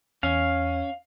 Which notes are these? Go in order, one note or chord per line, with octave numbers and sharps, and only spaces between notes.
E2 C#4 F5